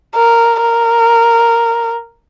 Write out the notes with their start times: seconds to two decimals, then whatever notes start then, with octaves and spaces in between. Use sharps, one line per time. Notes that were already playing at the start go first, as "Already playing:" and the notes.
0.15 A#4
0.61 A#4